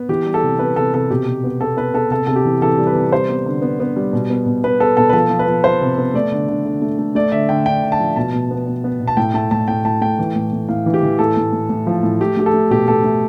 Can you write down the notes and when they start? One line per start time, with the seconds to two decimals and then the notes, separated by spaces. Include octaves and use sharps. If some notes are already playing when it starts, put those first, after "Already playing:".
Already playing: B3
0.09 E3 G4
0.25 G3
0.34 A4
0.43 C3
0.59 B3 B4
0.76 C3 A4
0.94 C3 A4
1.11 B2 G4
1.27 B2
1.44 B3
1.61 B3 A4
1.77 B3 B4
1.94 B3 A4
2.10 C3 A4
2.27 C3 A4
2.36 G4
2.45 E3
2.61 E3 A4
2.78 G3
2.87 B4
2.95 C3
3.12 G3 C5
3.29 B3
3.46 D3
3.62 B3
3.80 B3
3.96 G3
4.13 B2
4.30 B3
4.46 B2
4.64 B3 B4
4.80 B3 A4
4.97 B2 A4
5.09 B4
5.13 F3 A4
5.30 F3
5.39 B4
5.47 F3
5.64 F3 C5
5.81 C3
5.98 B3
6.14 A3 D5
6.32 D3
6.49 D3
6.65 D3
6.82 A3
6.99 A3
7.15 A3 D5
7.32 D3 E5
7.49 D3 G5
7.66 D3 G5
7.83 D3
7.92 A5
8.00 F3
8.16 B2 A5
8.33 B2
8.51 B3
8.67 B2
8.84 B3
9.00 B2
9.07 A5
9.17 A2 G5
9.34 A3 A5
9.51 A2 A5
9.68 A2 G5
9.84 A2 A5
10.01 A3 G5
10.19 E3
10.36 A2
10.53 A2
10.69 A2 F5
10.86 E3
10.94 G4
11.03 E3
11.19 A2 A4
11.37 A2
11.52 A2
11.69 A2
11.87 F3
12.03 A2
12.20 A3 G4
12.37 A3 G4
12.46 A4
12.54 A3
12.70 B2 G4
12.87 B2 A4
13.04 A3